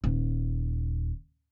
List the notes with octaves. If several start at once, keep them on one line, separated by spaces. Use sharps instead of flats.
D#1